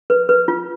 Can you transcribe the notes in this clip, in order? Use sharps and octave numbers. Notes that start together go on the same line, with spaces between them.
B4
B4
F4